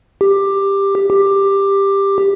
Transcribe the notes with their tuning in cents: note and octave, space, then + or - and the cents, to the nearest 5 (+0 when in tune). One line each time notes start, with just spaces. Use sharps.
G4 +10
G4 +10